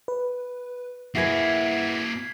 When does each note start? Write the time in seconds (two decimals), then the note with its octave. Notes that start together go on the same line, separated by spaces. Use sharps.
0.08 B4
1.15 A#3 E4 F#4 G#4 B4 G#6 B6 C7